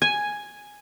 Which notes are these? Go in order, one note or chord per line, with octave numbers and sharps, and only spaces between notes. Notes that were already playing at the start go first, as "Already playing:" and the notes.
G#5